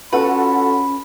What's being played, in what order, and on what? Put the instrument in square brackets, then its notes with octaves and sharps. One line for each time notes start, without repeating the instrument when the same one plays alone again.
[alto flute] C#4 [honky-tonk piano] F4 F#4 A4 [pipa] B4 [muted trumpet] B5